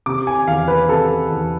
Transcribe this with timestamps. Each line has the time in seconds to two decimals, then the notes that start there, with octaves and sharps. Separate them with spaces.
0.06 C3 D6
0.27 G#5
0.47 E2 F5
0.68 B4
0.88 C3 A4
1.30 E2